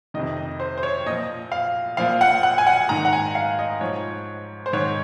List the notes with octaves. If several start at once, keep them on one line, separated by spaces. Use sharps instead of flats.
F2 C3 D#3 D#5
D#5
C5
C5
C#5
A#2 F3 D#5
F5
A#2 F3 F5
F#5
F#5
G#5
F#5
G#2 D#3 A#5
F#5
G#5
F5
D#5
G#2 F3 C#5
C5
G#2 D#3 C#5